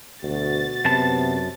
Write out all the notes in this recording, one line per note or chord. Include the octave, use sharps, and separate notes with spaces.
D2 B2 B3 F#4 A6
F#2 C3 B3 A5